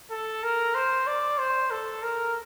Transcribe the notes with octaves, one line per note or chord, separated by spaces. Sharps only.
A4
A#4
C5
D5
C5
A4
A#4